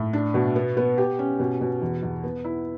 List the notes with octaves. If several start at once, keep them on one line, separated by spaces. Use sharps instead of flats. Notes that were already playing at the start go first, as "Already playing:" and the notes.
Already playing: A2
D4
B2
B3
B3
G4
C#4
B2
B2
E2
E2
B3
E4